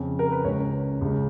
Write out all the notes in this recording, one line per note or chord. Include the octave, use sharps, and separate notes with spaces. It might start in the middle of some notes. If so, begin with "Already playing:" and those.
Already playing: F2 C#3
A#4
B4
C#2 C#3 C#5
C#2 C#3